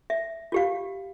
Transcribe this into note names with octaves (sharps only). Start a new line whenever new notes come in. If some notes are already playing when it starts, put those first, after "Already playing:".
E5
F4 G4 F5